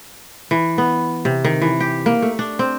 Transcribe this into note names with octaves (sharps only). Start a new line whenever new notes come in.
E3
B3
C3
D#3
E3
G4
A#3
A3
D4
C4